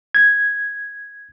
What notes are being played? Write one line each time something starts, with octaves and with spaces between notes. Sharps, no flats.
G#6